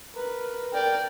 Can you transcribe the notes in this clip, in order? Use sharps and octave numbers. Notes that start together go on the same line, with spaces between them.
A#4 B4
A#4 D5 G5